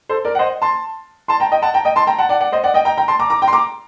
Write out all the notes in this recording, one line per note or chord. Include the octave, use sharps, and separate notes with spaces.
A4 C5
A#4 D5
F#5
C5 D#5
A5 C6
A5 C6
G5 A#5
D#5 G5
F#5 A5
G5 A#5
D#5 G5
A5 C6
G5 A#5
F#5 A5
D5 F#5
D5 F#5
C5 D#5
D5 F#5
D#5 G5
G5 A#5
G5 A#5
A5 C6
A#5 D6
A#5 D6
G5 A#5
C6
A#5 D6